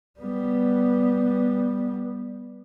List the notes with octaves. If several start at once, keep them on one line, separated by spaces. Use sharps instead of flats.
G3 B3